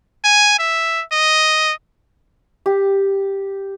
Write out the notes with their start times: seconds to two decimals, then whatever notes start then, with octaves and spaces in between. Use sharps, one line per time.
0.24 G#5
0.59 E5
1.12 D#5
2.66 G4